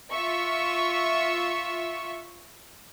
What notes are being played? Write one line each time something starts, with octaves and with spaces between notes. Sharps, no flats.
F4 E5 C#6